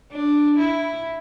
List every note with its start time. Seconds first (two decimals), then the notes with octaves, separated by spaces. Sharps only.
0.12 D4
0.58 E4